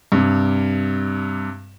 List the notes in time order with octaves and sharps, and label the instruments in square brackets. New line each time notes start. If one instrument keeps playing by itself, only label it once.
[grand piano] G2 C3